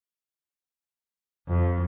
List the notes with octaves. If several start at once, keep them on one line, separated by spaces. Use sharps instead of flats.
F2